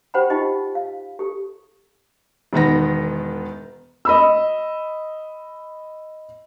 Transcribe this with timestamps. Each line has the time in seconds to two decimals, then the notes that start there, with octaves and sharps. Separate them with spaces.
0.14 G4 C5 F#5 G5 B5
0.30 D#4 F4 G4 D#5
0.75 F5
1.19 G4 A4
2.53 E1 D#3 B3 A#6
4.05 D#5 B5 E6